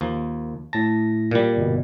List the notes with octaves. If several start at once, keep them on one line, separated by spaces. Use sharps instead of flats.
D#2 F3
A2 A5 A#6
A#2 G3
G1 B2